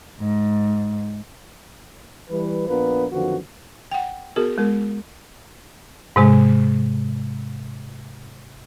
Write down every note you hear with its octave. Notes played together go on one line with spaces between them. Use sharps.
G#2
E3 G3 B4
A#1 B3 D4 F4 A#4 B4
F#2 D3 D#3 F3 B3 F#4
F#5 G5
B3 F#4 G#4 A#4
G#3 B3 A#4
G#2 C3 G#3